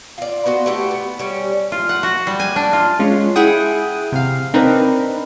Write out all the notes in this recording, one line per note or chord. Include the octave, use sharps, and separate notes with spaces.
F4 D5
B3 F#4 C5
A3 E4 F#4 G4
B3
G3 C#4
F4
F#5
F#4
G3
G#5
D4
F4
G#3 C#4 F4
E4 G#4 F#5 G5 D#6
C3 F5
C4 D4 D#4 A#4 B4